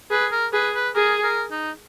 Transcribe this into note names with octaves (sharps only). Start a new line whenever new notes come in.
G#4 B4
A#4
G#4 B4
B4
G#4 A#4
A#4
D#4